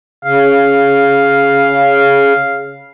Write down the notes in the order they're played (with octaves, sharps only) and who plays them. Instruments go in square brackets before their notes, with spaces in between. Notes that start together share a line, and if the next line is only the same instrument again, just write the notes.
[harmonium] C#3 [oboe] F5